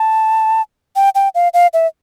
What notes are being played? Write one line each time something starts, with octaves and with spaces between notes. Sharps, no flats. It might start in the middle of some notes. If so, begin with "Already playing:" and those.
Already playing: A5
G5
G5
F5
F5
E5